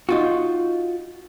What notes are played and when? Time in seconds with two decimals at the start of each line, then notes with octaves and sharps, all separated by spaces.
0.09 D#4 F4 F#4